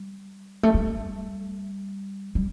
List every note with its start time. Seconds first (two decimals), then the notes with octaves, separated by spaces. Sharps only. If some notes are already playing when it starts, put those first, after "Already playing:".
Already playing: G3
0.63 A3
0.74 G3
2.35 G3